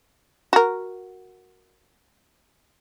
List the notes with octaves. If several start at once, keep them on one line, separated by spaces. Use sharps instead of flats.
F#4 A#4